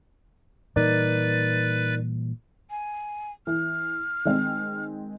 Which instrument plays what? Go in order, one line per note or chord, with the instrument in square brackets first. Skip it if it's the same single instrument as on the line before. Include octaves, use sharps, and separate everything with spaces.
[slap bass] A#2 E3 G3 [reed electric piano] D#4 A#4 D5 [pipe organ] B4 A6
[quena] G#5
[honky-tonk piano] E3 [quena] F6
[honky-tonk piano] D#3 G#3 C4